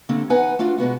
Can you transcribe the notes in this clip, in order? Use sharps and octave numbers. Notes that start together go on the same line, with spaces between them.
D3 G3 A3 A#3 C4
E2 B3 D#4 B4 F#5 G#5
A3 D4 F4 F#4
B2 G#3 B3 F#4